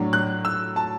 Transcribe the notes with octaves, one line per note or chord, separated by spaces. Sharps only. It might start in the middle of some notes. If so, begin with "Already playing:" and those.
Already playing: A2 F#3 D4
F#6
E6
A5